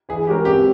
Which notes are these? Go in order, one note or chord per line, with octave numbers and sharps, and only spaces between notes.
E3 G#4
G#3 C#4 F#4 G4 A#4
C4 G4